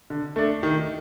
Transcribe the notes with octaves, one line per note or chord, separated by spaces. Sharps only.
D3
A3 D4
D#3